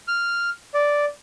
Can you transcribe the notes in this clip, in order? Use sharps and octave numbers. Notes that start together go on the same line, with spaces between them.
F6
D5